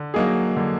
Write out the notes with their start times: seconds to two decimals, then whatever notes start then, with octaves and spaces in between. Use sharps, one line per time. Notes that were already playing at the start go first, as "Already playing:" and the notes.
Already playing: D3
0.14 F#3 A#3 D#4 G#4
0.57 D3